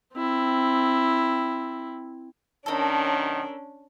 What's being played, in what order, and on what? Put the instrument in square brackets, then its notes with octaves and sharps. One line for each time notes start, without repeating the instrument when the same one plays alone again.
[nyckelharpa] C4 E4
[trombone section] F#2 B2 D#3 [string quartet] C#4 D4 [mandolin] A4 A#4